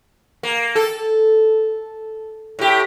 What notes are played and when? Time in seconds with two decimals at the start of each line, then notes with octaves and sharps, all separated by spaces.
0.43 A#3
0.76 A4
2.59 A2 G4